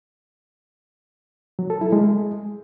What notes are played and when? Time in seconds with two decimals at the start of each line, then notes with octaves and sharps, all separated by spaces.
1.59 F#3
1.70 A4
1.81 E4
1.92 G#3